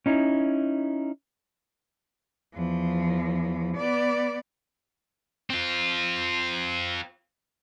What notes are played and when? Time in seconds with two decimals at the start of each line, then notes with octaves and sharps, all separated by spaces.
0.06 C#4 D#4 E4
2.53 E2 F3
3.77 B3 D5
5.50 C4 F4